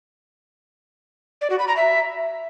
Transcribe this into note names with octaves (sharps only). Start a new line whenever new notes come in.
D5
F#4
B5
A#5
E5